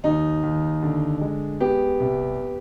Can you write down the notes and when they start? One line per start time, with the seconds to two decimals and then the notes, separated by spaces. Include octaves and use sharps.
0.04 D#2 D#4
0.43 D#2
0.83 D3
1.21 G#3
1.60 B3 G4
2.00 C2